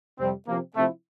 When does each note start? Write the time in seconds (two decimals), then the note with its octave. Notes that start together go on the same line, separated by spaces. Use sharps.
0.19 F2 C3 G3 C4
0.48 C3 F3 A#3 C4
0.76 C3 F3 A3 C4 E4